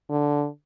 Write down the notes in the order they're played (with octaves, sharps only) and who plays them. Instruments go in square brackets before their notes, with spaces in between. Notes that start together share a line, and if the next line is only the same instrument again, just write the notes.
[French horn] D3